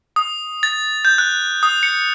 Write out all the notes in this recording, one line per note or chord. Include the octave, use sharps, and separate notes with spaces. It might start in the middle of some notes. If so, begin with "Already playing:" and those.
D#6
A6
G6
F#6
D#6
C#7